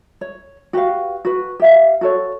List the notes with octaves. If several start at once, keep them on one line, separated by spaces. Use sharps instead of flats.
C#5
F#4 G4 B4 F5
F#4 B4
G4 E5 F5
F#4 A4 C#5